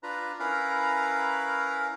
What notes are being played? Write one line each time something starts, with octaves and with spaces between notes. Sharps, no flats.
D4 F4 B4 A#5
C#4 E4 A#4 B4 F5 A#5